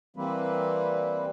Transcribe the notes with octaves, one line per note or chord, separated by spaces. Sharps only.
E3 G3 A#3 C4 B4